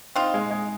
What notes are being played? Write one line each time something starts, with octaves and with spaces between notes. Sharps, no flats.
C4 D#4 F4
G#3
G#3